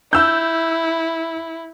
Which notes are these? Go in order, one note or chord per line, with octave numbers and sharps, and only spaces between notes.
E4 E6 G6